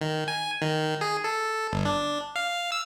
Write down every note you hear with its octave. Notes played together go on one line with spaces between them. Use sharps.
D#3
G#5
D#3
G#4
A4
G1
D4
F5
E6